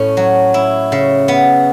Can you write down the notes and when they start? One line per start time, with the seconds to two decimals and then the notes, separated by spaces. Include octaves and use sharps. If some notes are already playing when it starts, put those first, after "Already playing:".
Already playing: A2 C#4
0.17 F#3
0.54 E4
0.92 C#3
1.28 B3